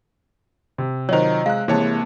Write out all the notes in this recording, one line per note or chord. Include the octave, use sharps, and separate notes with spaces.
C3
D#3 F#3 F4 C5 C#5 D#5 A#5
G#3 F5 F#6
C3 E3 G#3 A#3 C#5 A5